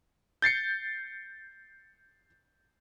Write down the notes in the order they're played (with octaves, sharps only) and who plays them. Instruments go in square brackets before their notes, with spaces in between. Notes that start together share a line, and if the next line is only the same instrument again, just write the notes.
[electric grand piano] G6 A6 C7 C#7